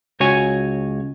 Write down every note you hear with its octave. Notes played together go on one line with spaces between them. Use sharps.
C#2 F#4 C#5 G#5